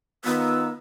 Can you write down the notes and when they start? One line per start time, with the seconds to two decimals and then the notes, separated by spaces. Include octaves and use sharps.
0.25 D#3 B3 D#4 F4 A#5 E6